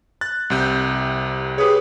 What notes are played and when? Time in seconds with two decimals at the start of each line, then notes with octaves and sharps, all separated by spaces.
0.21 F#6 A6
0.50 C2 C3 G6
1.58 G4 G#4 B4 C#5